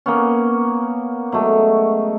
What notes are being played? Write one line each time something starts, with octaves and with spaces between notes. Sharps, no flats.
A#3 B3 C#4
F#3 G#3 A3